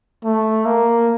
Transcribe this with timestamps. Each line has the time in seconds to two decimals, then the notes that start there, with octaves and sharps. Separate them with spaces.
0.24 A3
0.65 A#3